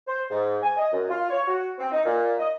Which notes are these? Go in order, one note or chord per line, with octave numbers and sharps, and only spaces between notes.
C5
G#2
G#5
D#5
F#2
F4
C#5
F#4
C4
D#4
A#2
D#5